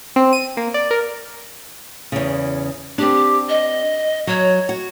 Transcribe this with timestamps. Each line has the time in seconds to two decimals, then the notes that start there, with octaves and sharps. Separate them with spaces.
0.16 C4
0.33 D#7
0.57 A#3
0.74 D5
0.91 A#4
2.12 E2 C#3
2.98 C4 D4 G4
3.49 D#5
4.27 F#3 C#5
4.69 F#4